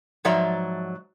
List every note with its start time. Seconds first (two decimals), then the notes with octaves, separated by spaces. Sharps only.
0.25 G#2 F3 F#3 D5 E5 A#5